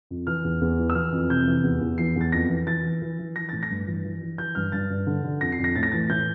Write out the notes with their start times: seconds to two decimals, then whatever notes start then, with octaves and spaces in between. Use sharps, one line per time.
0.10 F2
0.27 E3 F6
0.44 E2
0.61 E2
0.79 E3
0.90 E6
0.95 E3 F6
1.12 F2
1.29 C3 G6
1.48 E3
1.64 E2
1.81 E2
1.98 E3 C7
2.16 E2 A6
2.32 F2 A#6
2.49 E3
2.67 E3 A6
2.84 E3
3.02 E3
3.19 E3
3.36 E3 A#6
3.49 A2 A6
3.63 A#6
3.70 G2
3.88 E3
4.05 E3
4.22 E3
4.38 E3 G6
4.55 G2 F6
4.72 G2 A6
4.90 G2
5.07 D3
5.24 D3
5.41 F2 A#6
5.52 C7
5.59 F2
5.64 A#6
5.75 A2 A6
5.83 A#6
5.92 E3 A6
6.10 A2 G6